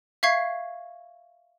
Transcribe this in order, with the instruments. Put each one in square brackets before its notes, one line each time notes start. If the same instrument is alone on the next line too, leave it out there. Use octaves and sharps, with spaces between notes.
[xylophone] E5 F5 C#6 G#6 C7